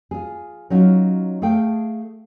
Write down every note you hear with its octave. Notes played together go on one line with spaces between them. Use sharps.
F4 G#4
F#3 C#4 D#4 F4 F#4
A3 G#4 A4 F5 G5